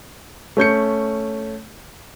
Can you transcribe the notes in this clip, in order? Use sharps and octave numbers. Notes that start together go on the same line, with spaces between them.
A3 C#4 G6 C#7